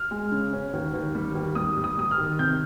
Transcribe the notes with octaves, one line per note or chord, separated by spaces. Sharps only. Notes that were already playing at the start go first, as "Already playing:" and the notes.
Already playing: F6
G#3
C#3
C#4
D#2
D#2
G3
D#2
G3 D#6
G3
D#6
G3 D#6
F6
D#3
C3 G6